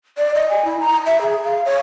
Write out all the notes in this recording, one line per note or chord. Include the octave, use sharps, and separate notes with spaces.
D5
D#5
G#5
E4
A#5
E5
G#4
F5
C#5